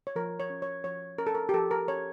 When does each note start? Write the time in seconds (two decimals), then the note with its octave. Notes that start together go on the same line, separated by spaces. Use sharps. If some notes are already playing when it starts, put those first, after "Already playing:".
0.07 C#5
0.16 F3 A#4
0.40 C#5
0.50 C#4
0.62 C#5
0.84 F3 C#5
1.18 C#4 A#4
1.27 A4
1.35 A#4
1.49 G4
1.54 F3 A4
1.71 A#4
1.88 C#4 C#5